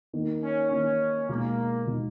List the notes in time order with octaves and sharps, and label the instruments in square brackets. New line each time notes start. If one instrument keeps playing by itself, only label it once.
[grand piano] D#3 A#3 D#4
[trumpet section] C#4
[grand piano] D#3 A#3 D#4 [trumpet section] C#4
[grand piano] B2 G#3 D#4 [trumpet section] A#3
[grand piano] B2 G#3 D#4